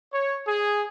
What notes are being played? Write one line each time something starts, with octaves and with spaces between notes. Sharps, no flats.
C#5
G#4